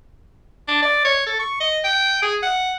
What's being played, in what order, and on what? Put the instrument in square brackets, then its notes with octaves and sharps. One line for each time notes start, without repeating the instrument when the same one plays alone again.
[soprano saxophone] D4
D5
C#5
A4
C#6
D#5
G5
G#4
F#5